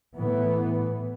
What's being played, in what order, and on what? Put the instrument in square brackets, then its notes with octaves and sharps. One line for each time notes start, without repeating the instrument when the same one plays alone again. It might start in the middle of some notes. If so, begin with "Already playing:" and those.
[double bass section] A2 E3 B3